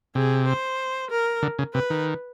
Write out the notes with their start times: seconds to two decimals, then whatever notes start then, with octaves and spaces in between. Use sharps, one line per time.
0.15 C3 G#4
0.48 C5
1.11 A#4
1.43 D3
1.59 C#3
1.74 C3 B4
1.90 D#3